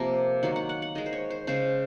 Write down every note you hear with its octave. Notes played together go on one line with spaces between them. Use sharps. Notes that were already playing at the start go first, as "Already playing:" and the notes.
Already playing: C3 F3 A#3 A#4
D#3 F#3 A#3 C#5
F#5
F#5
F#5
D#3 G#3 D#5
C5
C#5
C5
C#3 G#3 C5